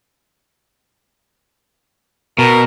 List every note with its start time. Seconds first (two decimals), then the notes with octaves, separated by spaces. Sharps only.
2.39 B2 A#4